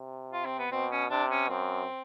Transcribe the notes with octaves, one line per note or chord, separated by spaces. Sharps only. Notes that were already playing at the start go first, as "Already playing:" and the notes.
Already playing: C3
F4
C4
B3
B2 C4
C#4
C3 D4
C#4
F#2 C4